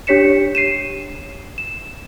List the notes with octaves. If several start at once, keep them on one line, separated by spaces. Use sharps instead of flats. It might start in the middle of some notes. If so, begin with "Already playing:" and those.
D4 G4 C#5 B6 C#7 E7
C7 D#7 E7
E7